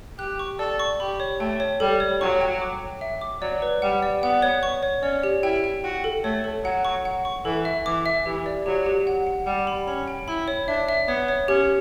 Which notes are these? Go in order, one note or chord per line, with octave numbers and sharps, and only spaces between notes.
G4 F#6
C#6
A4 D5
C#6
G4 B5
C#5
A3 G5
C#5
G3 A4
C#5
F#3 C#6
G5
D6
G5
E5
D6
F#3 D5
B4
G3 F#5
D5
B3 F#5
C#5
C#6
C#5
C#4 D5
G4
E4 G5
G5
F#4 G5
A4
A3 C#5
A4
F#3 F#5
C#6
F#5
C#6
E3 A4
E5
E3 D6
E5
E3 G4
D5
F#3 G4
G4
F#5
F#5
G3 F#5
B5
C#4 B5
G5
E4 B5
C#5
D4 E5
E5
B3 C#5
C#5
C#4 G4